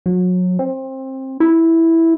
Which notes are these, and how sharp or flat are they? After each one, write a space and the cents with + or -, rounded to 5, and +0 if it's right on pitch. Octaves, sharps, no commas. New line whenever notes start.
F#3 -30
C4 +20
E4 -5